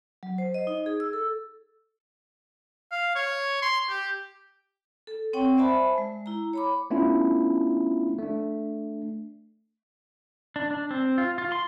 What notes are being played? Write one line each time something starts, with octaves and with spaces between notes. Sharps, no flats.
F#3
C5
D#5
D#4
G#4
E6
A4
F5
C#5
C6
G4
A4
C4 C#5 F#5 G5 C#6
C5 D5 E5 G#5 A5 B5
G#3
E4 A#5
C#5 B5 D6
A3 B3 C#4 D4 E4 F4
A3 D4
D4
D4
C4
F4
F4
C6